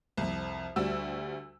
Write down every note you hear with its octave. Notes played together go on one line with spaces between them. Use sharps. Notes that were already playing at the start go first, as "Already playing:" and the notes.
C2 F2
D2 G3 F#4 E6